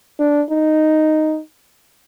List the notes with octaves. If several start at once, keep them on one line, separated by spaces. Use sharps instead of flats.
D4
D#4